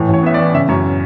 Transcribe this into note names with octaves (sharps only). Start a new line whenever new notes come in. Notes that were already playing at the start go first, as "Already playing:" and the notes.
Already playing: A2 E3
A1
C#5
B3 E5
D5
E3
C#3 E5
F#2 C#5